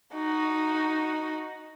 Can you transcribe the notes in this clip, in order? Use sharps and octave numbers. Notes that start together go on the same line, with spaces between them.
D#4 F#4